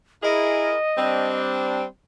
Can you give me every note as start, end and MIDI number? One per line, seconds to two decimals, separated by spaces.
0.23 0.75 64
0.23 0.75 68
0.23 0.75 70
0.23 1.40 75
0.98 1.84 55
0.98 1.84 60
0.98 1.84 62